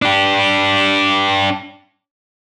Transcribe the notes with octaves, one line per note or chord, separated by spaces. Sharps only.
D4 G4